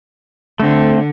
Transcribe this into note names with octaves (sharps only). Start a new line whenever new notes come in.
D3 A3 C4